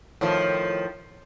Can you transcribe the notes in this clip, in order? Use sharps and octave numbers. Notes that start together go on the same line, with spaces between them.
A2 D#3 F3